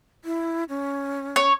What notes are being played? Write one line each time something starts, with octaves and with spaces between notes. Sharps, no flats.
E4
C#4
C#5